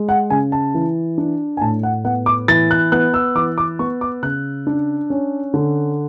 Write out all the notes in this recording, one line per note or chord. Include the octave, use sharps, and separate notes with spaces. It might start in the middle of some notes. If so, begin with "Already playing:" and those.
Already playing: G#3
F#5
C#3 G#5
A5
E3
D4
G#5
A2 A5
F#5
B3 F#5
D6
E3 A6
F#6
B3 F#6
E6
E3 D6
D6
B3 C#6
D6
C#3 F#6
D4
C#4
D3